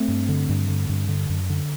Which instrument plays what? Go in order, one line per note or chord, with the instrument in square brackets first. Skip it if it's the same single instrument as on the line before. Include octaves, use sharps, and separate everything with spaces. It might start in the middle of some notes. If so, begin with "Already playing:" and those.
Already playing: [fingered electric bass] A3 C4
G2
D3
G2
D3
G2
D3
F#2
D3